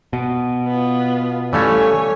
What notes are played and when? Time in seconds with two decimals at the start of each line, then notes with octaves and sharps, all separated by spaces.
0.13 B2
0.67 B3 F4
1.53 E3 G3 A3 C#4 A4 C#5 F5 G#5